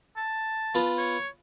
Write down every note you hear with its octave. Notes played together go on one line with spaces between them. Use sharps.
A5
B3 F4
C#5